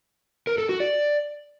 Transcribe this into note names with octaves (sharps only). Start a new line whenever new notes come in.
A#4
A4
F#4
D5